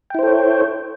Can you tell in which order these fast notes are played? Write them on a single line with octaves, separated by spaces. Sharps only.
G5 E4 C5 A4 C#5